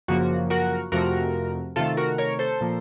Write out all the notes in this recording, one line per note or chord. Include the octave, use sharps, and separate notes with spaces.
F#2 C#3 F3 A#3 F#4
F#4 A#4
F2 C3 F3 A3 F#4 A#4
C3 D#3 A3 F4 A4
F#4 A#4
A#4 C#5
A4 C5
A#2 F3 A#3